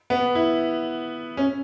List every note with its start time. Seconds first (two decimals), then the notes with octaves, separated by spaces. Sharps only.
0.10 B3
0.35 E4
1.37 C#4